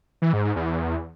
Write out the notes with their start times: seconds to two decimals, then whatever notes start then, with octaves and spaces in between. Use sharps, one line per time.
0.22 E3
0.33 G#2
0.45 G#2
0.56 E2